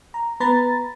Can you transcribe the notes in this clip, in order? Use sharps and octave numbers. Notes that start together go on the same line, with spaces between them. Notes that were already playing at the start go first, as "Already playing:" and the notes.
A#5
B3 B4 A#5 B5 A6